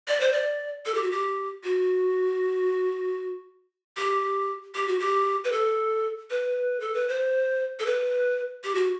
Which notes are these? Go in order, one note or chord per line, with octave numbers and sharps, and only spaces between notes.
D5
C5
D5
A4
G4
F#4
G4
F#4
G4
G4
F#4
G4
B4
A4
B4
A4
B4
C5
A4
B4
G4
F#4